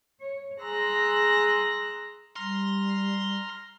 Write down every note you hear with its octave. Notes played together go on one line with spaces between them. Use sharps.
C#5
G#4 A#5 C6 E6 F#6 A#6
G3 A#5 C6 F6